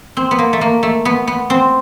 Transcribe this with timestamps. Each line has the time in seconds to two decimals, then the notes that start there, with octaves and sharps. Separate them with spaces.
0.17 C4
0.31 B3
0.39 A#3
0.53 A3
0.61 A#3
0.83 A3
1.05 B3
1.27 B3
1.50 C4